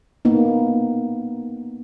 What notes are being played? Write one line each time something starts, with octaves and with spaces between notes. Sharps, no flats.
A#3 B3 D#4